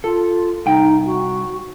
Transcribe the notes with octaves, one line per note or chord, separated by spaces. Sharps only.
F4 A4
C2 D#4 G5
F#4